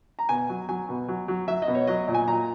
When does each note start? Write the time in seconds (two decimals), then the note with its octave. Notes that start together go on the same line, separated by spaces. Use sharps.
0.19 A#5
0.29 B2 G#5
0.49 F#3
0.69 F#3 G#5
0.89 B2
1.08 F#3
1.28 F#3
1.48 F#3 E5
1.62 D#5
1.68 B2
1.75 C#5
1.87 F#3 D#5
2.08 A#2
2.14 G#5
2.28 A#2 A#5